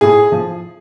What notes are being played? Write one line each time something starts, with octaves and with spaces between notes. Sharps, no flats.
A2 G#4
F3